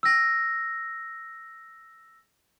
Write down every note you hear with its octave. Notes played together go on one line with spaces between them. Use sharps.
E6 A#6